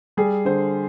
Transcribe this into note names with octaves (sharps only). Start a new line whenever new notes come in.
G3 G#4
D3 C5